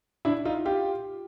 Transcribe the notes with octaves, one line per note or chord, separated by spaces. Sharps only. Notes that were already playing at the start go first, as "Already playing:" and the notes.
D4 E4
D#4 F4
F4 G4